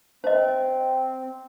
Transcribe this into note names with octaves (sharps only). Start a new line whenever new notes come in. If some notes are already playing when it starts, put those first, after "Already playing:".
C4 C5 D#5